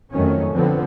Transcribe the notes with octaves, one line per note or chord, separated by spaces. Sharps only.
F2 D#3 F#3 A3 C#4
D3 F3 B3 C4